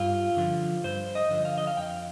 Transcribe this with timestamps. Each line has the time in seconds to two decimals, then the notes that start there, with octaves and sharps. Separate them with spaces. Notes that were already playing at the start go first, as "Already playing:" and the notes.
Already playing: G2 F4
0.37 D3 F3
0.84 G2 C5
1.15 D#5
1.30 D3 F3
1.45 F5
1.58 D#5
1.67 F5
1.77 F2 G5